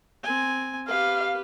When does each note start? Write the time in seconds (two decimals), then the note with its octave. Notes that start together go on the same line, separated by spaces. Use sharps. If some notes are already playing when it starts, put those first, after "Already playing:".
0.23 C4 G#5
0.88 G4 B4 F5